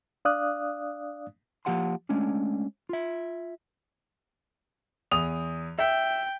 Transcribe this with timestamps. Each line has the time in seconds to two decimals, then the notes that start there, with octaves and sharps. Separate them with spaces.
0.25 D4 D5 F5 D#6 F#6
1.65 F3 A#3 G4 F#5 A5 C6
2.09 G#3 A3 C#4 D4
2.89 F4 E5
5.11 E2 D#6 F7
5.79 E5 G5